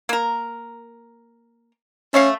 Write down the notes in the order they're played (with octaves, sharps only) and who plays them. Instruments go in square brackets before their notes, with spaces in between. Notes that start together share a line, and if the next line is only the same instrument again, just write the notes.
[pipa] A#3 A#4
[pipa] A3 C#5 F5 [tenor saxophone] C#4